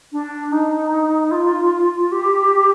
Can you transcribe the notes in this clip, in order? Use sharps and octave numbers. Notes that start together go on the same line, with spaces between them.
D4
D#4
F4
G4